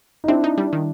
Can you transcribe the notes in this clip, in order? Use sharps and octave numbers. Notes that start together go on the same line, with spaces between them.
D#4
C4 D4 E4
D#4
G3
D#3